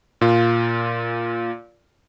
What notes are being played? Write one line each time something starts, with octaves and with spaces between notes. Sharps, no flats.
A#2 F4